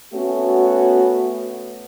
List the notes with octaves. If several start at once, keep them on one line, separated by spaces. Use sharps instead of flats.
A3 B3 C#4 F#4